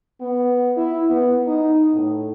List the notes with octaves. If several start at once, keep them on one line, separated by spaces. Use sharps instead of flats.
B3
E4
B3
D#4
A2